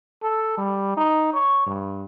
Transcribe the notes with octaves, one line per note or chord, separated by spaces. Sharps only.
A4
G3
D#4
C#5
G2